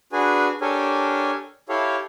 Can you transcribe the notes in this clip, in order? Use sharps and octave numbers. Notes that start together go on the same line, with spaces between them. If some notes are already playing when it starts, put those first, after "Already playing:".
D4 F#4 G#4 B4 G#5
D4 G4 A4 A#4 C#5 G#5
E4 G4 A4 C#5 F5